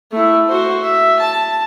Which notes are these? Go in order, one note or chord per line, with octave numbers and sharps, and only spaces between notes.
A3 E4
F#4 C5
E5
A5